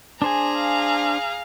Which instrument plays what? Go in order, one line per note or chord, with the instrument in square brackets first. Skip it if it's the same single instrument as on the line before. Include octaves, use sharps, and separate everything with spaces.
[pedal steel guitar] D4 C5 G#5 [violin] G#4 A#5
[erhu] F5